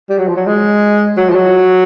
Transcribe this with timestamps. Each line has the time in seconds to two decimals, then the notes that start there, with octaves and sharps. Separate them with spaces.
0.10 G3
0.19 F#3
0.28 F3
0.36 F#3
0.46 G#3
1.17 F#3
1.30 F3
1.35 F#3